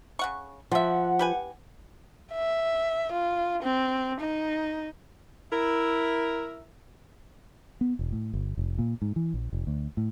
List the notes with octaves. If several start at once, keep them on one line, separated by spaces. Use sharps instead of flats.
C#3 F#5 C#6
F3 F4 E5 F#5
G4 B4 G#5
E5
F4
C4
D#4
E4 A#4 E5
B3
E1
A2
G1
F1
A#2
G#2
E3
A#1
F1
D2
A2